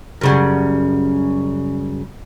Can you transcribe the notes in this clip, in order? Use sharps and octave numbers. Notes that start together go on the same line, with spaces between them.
F#2 C#3 G3